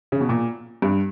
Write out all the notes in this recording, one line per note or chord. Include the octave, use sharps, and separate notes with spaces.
C#3
B2
A#2
G2